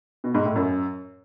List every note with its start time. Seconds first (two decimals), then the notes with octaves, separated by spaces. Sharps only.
0.24 B2
0.34 G#2
0.45 A2
0.56 F#2